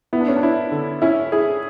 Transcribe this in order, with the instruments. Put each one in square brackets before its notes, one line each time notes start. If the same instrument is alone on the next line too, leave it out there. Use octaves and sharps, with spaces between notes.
[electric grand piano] B3 [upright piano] E4
[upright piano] D4
C#4
D4
[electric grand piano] E4
D3
[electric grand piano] C#4 [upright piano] E4
[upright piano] E4 [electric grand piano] G#4